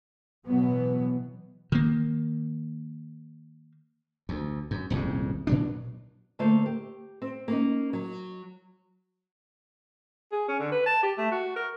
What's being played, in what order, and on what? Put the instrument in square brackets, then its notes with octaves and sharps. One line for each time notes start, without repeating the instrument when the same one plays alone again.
[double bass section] B2 E3 F#3 B3
[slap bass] D#3 A#3
D2
F#2
D#1 C2 F2 G#2
A#2 F#3 D4
[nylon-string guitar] D3 A3 A#3 C5
G4
C4
A#3 C#4 D#4
F#3
[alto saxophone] G#4
C#4
D3
B4
A5
G4
A3
F#4
A#4